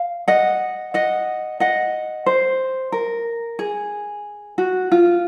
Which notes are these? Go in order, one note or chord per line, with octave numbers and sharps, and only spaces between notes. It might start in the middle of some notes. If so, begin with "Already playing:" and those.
Already playing: F5
D#5 F#5
D#5 F#5
D#5 F#5
C5
A#4
G#4
F#4
F4